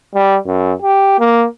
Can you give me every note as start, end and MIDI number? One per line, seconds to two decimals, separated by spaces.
0.14 0.36 55
0.46 0.73 42
0.82 1.16 67
1.19 1.45 58